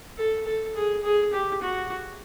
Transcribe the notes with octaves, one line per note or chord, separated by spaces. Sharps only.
A4
A4
G#4
G#4
G4
F#4